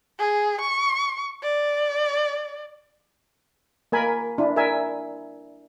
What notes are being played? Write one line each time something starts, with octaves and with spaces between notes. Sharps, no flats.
G#4
C#6
D5
A#3 A#4 G#5 B5
D4 E4
A#4 E5 G#5